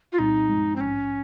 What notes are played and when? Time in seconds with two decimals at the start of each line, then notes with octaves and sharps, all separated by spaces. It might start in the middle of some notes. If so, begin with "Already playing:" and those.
0.12 F4
0.19 C2 A#2 G3 C4 D#4
0.49 G2 F3 G#3
0.76 C4
0.80 A#1 G#2 F3 C#4